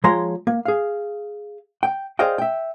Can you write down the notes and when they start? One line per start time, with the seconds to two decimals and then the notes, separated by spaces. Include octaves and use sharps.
0.04 F3 G#3 C#5 A#5 C6
0.47 A#3
0.65 G#4 F5
1.83 G5
2.19 G#4 C5 D5 D#5 F5 G5
2.38 E5 G5